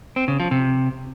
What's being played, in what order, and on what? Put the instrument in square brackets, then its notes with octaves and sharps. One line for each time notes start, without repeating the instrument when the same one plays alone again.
[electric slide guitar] C4
C#3
F3
C3